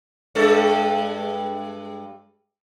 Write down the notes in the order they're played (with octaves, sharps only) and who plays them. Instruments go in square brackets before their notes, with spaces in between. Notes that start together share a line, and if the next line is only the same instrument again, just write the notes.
[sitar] G2 G#3 A4